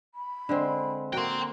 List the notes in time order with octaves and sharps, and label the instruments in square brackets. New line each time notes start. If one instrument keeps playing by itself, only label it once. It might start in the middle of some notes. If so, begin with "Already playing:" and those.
[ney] B5
[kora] D3 G#3 C4
[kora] A#3 F#4 [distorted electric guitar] G5 C6 [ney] A#5